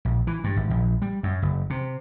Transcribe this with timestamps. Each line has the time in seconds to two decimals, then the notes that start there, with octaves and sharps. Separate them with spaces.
0.05 A#1
0.27 E3
0.44 G2
0.56 G#1
0.70 A#1
1.02 G3
1.23 F#2
1.42 F#1
1.70 C3